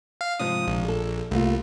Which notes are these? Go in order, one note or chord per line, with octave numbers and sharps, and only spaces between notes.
F5
G#2 C3 F3 D#6
A#1
G#4 A4
C2 A3 A#3 F4